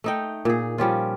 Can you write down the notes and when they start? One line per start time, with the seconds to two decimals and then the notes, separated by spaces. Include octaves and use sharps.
0.04 A3 D#4 G5
0.45 A#2 G#4
0.78 F3 G3 C#4 F4